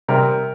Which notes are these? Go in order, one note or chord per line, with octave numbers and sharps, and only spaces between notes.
C3 G3 C4 A#4